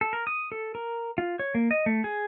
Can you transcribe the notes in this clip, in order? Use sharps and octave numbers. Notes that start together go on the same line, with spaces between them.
A4
A#4
D#6
A4
A#4
F4
C#5
A#3
D#5
A3
G#4